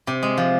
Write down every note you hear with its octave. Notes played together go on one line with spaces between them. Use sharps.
C3
G#3
F3